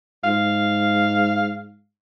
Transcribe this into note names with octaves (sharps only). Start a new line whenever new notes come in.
G#2 F5